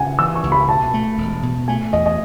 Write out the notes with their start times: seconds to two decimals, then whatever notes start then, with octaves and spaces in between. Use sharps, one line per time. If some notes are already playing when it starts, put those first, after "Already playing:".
Already playing: C#3 F#5 G#5
0.19 E3 E6
0.35 C#6
0.43 C#2
0.52 B5
0.68 B2 A5
0.94 A3
1.18 E1
1.43 B2
1.68 A3 G#5
1.93 E2 D#5
2.06 D#5